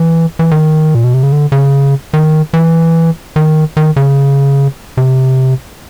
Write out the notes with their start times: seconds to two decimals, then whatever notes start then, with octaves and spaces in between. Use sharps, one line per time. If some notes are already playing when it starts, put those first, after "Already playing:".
Already playing: E3
0.39 E3
0.51 D#3
0.95 A#2
1.04 B2
1.14 C3
1.23 C#3
1.32 D3
1.52 C#3
2.13 D#3
2.53 E3
3.36 D#3
3.77 D#3
3.96 C#3
4.97 C3